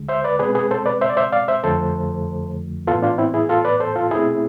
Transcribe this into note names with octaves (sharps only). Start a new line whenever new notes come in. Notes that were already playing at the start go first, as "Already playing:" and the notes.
Already playing: D2 D3 G#3
C5 E5
B4 D5
B2 G#3 C4 G#4 B4
G#4 B4
A4 C5
B4 D5
C5 E5
D5
C5 E5
D5 F5
C5 E5
F2 D3 F3 A3 A4 C5
A2 E3 B3 F4 A4
D4 F4
C4 E4
E4 G#4
F4 A4
B4 D5
A4 C5
F4 A4
B2 A3 C4 E4 G#4